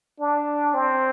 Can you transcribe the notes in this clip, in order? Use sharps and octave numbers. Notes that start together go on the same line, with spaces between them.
D4
C4